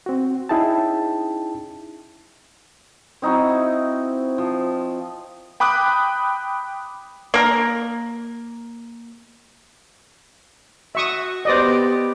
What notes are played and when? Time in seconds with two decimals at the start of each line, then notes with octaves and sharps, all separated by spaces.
0.06 C4 F#4
0.49 C#4 D#4 E4 G#4 G5 A5
3.22 C4 D#4 E4 F#4
4.38 F3
5.60 G5 B5 D6 D#6 F#6
7.34 A#3 A#4
10.95 F#4 E5 C#6 D#6
11.45 B3 G4 C5 D5 D#5